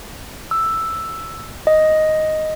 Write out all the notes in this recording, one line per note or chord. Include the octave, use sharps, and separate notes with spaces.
E6
D#5